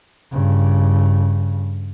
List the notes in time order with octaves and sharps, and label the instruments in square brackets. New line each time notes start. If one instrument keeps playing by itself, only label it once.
[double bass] G2 C#3